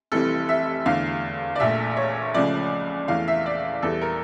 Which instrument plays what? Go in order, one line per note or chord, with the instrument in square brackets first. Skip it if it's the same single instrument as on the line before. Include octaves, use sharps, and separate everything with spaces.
[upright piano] F1 F2 E3 G3 A4
E5
E2 D3 A3 F5
D5
A#1 A#2 A3 E5
C#5
C#2 C#3 F3 A3 D5
E2 E3 A3 F5
E5
D5
E2 E3 G3 A4
A#4